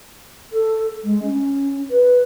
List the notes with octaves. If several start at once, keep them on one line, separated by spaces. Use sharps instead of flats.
A4
G#3
C#4
B4